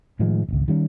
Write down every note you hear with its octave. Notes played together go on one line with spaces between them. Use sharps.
A2 D#3 F3 G#3
D1 G#1 C#2
D#3 G3 C#4